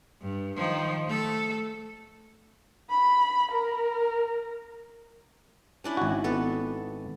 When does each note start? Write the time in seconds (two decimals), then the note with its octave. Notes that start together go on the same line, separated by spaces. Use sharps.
0.21 G2
0.57 D#3 F3
1.07 A3 A4
2.90 B5
3.52 A#4
5.84 C#4 D4 E4
5.97 G#1 F#4
6.24 B3 A4